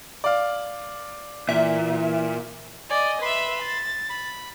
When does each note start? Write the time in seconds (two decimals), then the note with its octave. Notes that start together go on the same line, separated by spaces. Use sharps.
0.24 D5 F5
1.49 A#2 E3 E5
2.90 D5 D#5 G#5
3.22 B4 E5 B5 C6
3.62 A6
4.10 B5